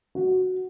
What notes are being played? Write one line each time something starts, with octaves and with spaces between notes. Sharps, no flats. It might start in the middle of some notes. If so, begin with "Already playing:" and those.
F#4